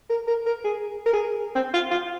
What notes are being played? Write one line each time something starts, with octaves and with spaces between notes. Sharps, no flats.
A#4
A#4
A#4
G#4
A#4
G#4
C4
F4
F4